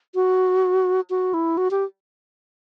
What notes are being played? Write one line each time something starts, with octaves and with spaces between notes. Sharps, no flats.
F#4
F#4
E4
F#4
G4